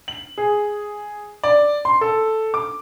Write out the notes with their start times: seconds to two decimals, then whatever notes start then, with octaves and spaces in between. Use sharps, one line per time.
0.08 F#7
0.38 G#4
1.43 D5
1.85 C6
2.01 A4
2.54 D6